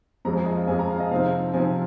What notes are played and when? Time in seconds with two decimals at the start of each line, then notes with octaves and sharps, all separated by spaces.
0.25 F2 F3 G#3 C4 A#5
0.35 G#5
0.46 D#5
0.57 F5
0.67 F2 F3 G#3 C4 G#5
0.79 A#5
0.90 F5
1.00 D#5
1.11 C3 F3 C4 D#4 F5
1.53 C3 F3 C4 D#4 G#5